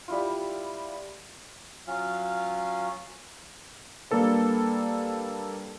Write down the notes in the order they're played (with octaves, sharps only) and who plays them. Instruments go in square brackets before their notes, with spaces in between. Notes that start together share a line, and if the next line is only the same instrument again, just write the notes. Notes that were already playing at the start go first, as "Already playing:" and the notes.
[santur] G3 E4 F4
[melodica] F#3 C#4 F4 F5
[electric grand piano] G3 A#3 D4 A4 B4